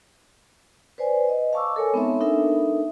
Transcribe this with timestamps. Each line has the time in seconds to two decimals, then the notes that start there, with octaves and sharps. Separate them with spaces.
0.98 B4 C5 D5 G#5
1.29 D#5
1.53 F5 A5 C#6 D6 E6
1.76 A4 A#4 C#5 G#5 A5
1.93 G#3 B3 C4 D#4 C#5 E5
2.21 D4 D#4 A4 A#4 E5